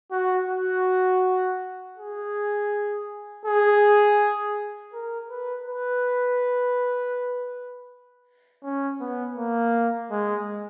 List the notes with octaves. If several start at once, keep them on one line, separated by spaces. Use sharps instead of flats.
F#4
F#4
G#4
G#4
A#4
B4
B4
C#4
B3
A#3
G#3